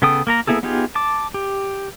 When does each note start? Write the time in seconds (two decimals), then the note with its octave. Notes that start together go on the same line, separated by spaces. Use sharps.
0.02 C#3 B3 A4 G5 D#6
0.27 A#3 A#4 A#5
0.47 A#3 B3 E4 G#4 A4
0.63 B3 D#4 F4 G4 G#4
0.95 A5 D6
1.34 G4